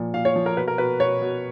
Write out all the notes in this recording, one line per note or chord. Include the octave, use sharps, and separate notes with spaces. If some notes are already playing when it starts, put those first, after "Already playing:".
Already playing: A#2 F3
A#2 F5
C#5
F3
A#4
B2 B4
A#4
B2 B4
B2 C#5
B2